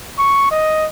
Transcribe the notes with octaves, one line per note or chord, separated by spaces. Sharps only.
C#6
D#5